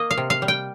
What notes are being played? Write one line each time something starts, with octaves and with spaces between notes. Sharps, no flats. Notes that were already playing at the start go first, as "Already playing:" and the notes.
Already playing: A#3 D#5
F5
C3
F5
G3
G5